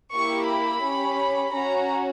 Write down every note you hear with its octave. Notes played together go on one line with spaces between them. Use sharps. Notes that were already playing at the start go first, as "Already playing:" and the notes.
A#3 E4 G4 C#6
B5
C#4 G4
C#4 F#4 A#5